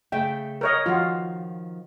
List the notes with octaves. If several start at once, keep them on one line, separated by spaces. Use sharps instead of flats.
C#3 A3 E5 G5
A#4 C#5 D#5
D#3 F3 F4 F#4